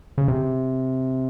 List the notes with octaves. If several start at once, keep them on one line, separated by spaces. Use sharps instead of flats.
C#3
C3